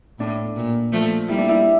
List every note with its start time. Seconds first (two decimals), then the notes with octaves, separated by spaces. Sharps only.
0.19 A2 D4
0.56 A#2
0.92 F3 A3
1.28 G3 A#3 E4
1.38 D4
1.49 E4